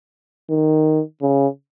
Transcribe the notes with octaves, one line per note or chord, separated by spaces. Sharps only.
D#3
C#3